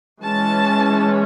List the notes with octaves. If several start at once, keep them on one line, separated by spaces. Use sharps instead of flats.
E3 G#3 C#4 A5